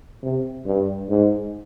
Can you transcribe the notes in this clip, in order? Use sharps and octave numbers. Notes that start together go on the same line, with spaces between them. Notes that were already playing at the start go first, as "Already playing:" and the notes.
C3
G2
G#2